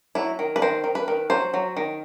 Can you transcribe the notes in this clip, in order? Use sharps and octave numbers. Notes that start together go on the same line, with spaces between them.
F#3 E4
D#3
B4
D#3 C5
D#3
B4
D#3
F#3 C5
F#3
D#3